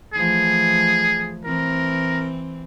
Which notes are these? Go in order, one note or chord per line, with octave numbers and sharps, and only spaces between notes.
E3 F3 A3 G#4
E3 C4 A#4